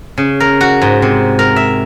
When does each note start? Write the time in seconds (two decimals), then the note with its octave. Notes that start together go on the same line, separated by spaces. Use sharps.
0.18 C#3
0.40 A#4
0.61 F#4
0.82 G#2
1.02 C3
1.39 A#4
1.56 E5